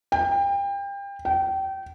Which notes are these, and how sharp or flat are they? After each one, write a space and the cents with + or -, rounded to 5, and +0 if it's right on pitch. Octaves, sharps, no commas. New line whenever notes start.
G5 +30
G5 -25